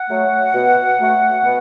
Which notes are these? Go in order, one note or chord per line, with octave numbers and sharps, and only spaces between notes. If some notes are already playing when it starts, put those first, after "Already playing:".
Already playing: F#5
F#3 A3
B2
F#3 A3
B2